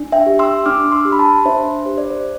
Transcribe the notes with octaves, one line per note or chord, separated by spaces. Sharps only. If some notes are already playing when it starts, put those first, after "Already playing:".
Already playing: D4
E5 G5
G4
C6 E6
D4 D6 F6
C6 E6
G4
B5
A5 C6
D4 C5 E5
G4 C5
D5
C5